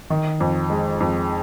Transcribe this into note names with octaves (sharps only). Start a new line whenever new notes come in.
D#3
F2
G#3
F2